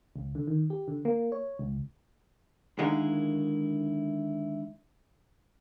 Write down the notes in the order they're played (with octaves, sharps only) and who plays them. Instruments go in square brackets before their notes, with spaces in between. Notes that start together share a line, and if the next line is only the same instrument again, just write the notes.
[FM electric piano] C#2
D3
D#3
G4
D3
A#3
C#5
C#2
[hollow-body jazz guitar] D3 D#3 G#3 A#3 D#4 E4